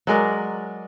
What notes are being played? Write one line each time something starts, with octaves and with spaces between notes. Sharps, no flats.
F#3 G#3 A#4 D5